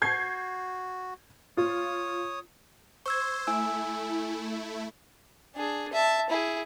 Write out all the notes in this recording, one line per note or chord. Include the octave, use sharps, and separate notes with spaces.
F#4 G6 G#6 C7
F4 C#5 D#6
C5 C#6 E6 G#6
A3 E4 G#5 E6
D4 G#4
E5 A5
E4 G#4